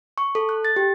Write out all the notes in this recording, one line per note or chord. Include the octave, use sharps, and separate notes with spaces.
C#6
A4
F#6
A6
G4